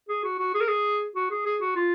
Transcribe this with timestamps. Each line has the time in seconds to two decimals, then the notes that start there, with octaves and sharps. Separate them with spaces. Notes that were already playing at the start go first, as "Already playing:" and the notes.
0.09 G#4
0.24 F#4
0.39 F#4
0.54 G#4
0.61 A#4
0.68 G#4
1.15 F#4
1.30 G#4
1.45 G#4
1.61 F#4
1.76 F4